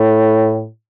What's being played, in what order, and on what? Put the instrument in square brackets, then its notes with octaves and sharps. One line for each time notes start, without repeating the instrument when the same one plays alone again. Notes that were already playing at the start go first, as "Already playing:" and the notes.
Already playing: [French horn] A2